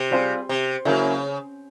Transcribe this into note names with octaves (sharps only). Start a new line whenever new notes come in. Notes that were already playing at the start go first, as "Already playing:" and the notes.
Already playing: C3
G3 C4 F4 G#4 C5
C3
C#3 F#3 A#3 C#4 E4